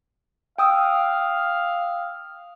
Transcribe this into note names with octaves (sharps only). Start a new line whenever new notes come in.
F5 G5 D#6 E6